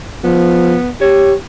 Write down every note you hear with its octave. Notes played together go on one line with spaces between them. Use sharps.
F3 B3
G4 C#5